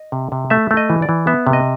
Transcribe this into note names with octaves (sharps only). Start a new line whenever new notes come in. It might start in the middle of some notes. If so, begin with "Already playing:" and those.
Already playing: D#5
C3
C3
A3 E5
A3
D#5
E3
D5
E3
B3 E5
C3
D#5